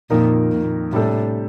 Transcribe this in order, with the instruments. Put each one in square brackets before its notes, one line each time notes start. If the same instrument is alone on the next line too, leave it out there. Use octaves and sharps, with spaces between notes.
[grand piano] F2 D#3 A#3 D#4 A#4 [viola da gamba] A#2
[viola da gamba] A#2
[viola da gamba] A2 [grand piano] C3 G3 D4 A4